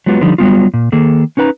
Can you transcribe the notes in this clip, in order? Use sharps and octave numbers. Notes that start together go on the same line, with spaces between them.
F#3 G#3 B3 F4 G4
D3 F3 G3 D#4
F#3 G3 B3 F4
A#2
D#3 A#3 G#4 A4
C#4 D#4 B4 F#5 A#5